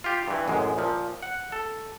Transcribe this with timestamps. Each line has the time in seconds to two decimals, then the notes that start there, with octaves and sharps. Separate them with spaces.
0.04 F4 G4
0.28 G2 E3
0.48 A1 F#2 G#3
0.78 A#2 F3
1.23 F#5
1.52 A4